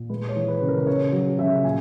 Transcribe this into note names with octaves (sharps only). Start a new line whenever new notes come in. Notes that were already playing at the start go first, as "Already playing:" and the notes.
Already playing: A#2
G#3 B4
C#5
E3
B4
C#3
A#4
C#3 C#5
F#3
C#3 E5
A#2 G#5